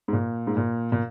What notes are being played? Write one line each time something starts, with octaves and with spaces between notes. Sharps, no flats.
G#2
A#2
G#2
A#2
A#2